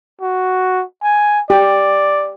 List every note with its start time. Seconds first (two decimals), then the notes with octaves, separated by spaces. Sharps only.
0.21 F#4
1.02 G#5
1.50 G4 D5